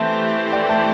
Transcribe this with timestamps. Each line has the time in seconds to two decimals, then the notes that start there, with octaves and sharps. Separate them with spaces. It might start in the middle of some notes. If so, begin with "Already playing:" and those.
Already playing: E3 A3 C4 G4 C5 E5 A5
0.52 D5 G5
0.69 E5 A5